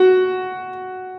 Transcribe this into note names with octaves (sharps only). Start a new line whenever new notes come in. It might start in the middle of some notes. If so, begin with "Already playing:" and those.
Already playing: F#4